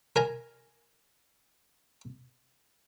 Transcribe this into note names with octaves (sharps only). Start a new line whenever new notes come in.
A#4 G#5 A#5